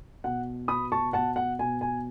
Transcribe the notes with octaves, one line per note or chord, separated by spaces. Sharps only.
B2 F#5
B2 B5 D#6
A5 C#6
B2 F#5 A5
F#5
B2 G#5
G#5